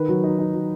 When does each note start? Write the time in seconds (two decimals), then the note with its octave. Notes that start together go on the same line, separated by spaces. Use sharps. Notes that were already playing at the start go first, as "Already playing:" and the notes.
Already playing: D#3 B4
0.09 F#3
0.24 D#4
0.39 D#4
0.54 F#3